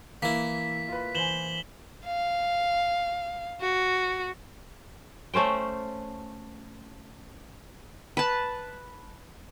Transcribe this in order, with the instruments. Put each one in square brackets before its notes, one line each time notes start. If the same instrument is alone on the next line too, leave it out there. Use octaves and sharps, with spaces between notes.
[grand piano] E3 [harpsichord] A#3 E4 [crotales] B6
[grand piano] F4 B4
[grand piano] E3 C5 G#5 [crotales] E7 F#7 G7
[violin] F5
F#4
[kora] A3 C#4 C5 G5
[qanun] B4 A5